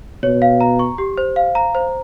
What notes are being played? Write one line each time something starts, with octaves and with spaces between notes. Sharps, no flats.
B2 C#5
F5
A#5
C#6
G4
C5
F5
A#5
C5